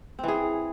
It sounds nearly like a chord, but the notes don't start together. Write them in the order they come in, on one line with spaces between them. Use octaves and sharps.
C4 E3 G#4